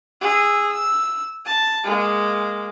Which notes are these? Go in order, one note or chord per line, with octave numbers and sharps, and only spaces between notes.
G#4 E6
E6
A5
G#3 A#3